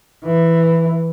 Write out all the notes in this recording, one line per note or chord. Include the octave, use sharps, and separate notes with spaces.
E3